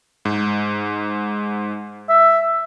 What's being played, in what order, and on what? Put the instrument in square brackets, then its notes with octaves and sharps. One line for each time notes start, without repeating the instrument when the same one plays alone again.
[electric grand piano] G#2
[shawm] E5